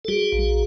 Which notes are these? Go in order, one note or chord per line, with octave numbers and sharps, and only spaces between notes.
A4
G3 F#4 G#4
A#1